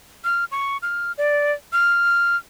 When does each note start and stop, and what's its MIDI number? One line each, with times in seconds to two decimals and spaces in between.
0.24 0.45 89
0.52 0.77 85
0.82 1.12 89
1.18 1.53 74
1.73 2.36 89